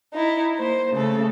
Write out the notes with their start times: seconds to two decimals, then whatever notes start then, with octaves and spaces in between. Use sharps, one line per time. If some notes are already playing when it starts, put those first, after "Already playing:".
0.12 D#4 E4
0.57 A#3 C5
0.92 C#3 A3 A4